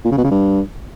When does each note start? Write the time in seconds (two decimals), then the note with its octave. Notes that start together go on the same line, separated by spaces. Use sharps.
0.05 A#2
0.11 C#3
0.18 B2
0.24 C#3
0.31 G2